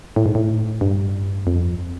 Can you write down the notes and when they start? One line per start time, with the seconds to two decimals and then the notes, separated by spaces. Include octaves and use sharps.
0.16 A2
0.26 G#2
0.35 A2
0.81 G2
1.47 F2